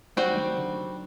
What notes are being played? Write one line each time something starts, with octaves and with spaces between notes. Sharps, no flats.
F#3 G3 C4 F#4
D#3
F#3
D3